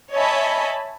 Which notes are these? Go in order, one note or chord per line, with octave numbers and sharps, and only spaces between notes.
C#5 D#5 E5 G#5 A5 B5